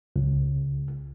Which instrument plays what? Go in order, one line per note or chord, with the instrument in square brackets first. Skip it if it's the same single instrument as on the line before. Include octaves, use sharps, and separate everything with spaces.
[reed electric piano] C#2